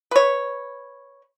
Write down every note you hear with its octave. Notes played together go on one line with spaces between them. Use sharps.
B4 C#5